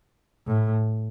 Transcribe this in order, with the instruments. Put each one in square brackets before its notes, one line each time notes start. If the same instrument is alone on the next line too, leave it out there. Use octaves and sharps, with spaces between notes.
[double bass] A2